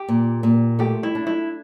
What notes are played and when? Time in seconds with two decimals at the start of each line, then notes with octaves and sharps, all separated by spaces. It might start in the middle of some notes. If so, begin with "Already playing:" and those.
Already playing: G4
0.09 A#2
0.43 A#2
0.79 A3 G4
1.03 E4
1.15 D4
1.27 E4